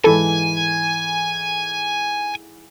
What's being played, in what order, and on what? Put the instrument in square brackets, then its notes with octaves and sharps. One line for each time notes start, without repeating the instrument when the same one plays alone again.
[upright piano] G#2 E3 B5 [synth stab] A4 [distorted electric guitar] G#5